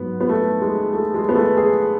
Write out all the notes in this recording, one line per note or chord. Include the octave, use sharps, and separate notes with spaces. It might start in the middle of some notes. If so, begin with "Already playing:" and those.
Already playing: G#2 F#3 B3
B3
A3
G#3
A3
G#3
B3
A3
G#4